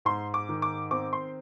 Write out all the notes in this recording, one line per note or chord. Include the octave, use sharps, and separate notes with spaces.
G#2 C6
D6
D#3
D6
C4 D6
C6